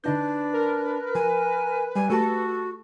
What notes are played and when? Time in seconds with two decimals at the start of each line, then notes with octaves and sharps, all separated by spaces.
0.04 D3 D4 D#4 B4 G6
0.53 A#4
1.15 F3 G#5
1.95 G3 G#5
2.10 A3 F#4 G4 A4 A5